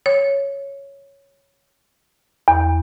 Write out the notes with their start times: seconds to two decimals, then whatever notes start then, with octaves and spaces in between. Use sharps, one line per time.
0.06 C#5
2.48 E2